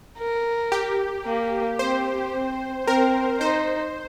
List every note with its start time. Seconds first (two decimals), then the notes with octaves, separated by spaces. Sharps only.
0.18 A#4
0.72 G4
1.26 A#3
1.79 C4 C5
2.33 C4
2.86 C4 A#4
3.40 D#4 C5